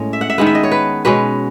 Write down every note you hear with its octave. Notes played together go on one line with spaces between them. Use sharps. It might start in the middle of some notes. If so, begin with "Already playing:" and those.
Already playing: A2 G#3 C#4
E5
F#5
E5
D#3 G#3 B3 F#5
E5
D#5
C#5
B4
B2 G#3 C#4 B4